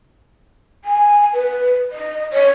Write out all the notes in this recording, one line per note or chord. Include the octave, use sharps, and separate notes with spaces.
G#5
B4
D#5
C#5